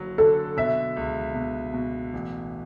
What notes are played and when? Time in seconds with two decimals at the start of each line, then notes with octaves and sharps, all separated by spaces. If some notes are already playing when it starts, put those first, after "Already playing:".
Already playing: F#1 D3 F#3
0.18 D3 A4
0.57 B2 E5
0.97 C#2
1.35 B2
1.74 B2
2.13 A1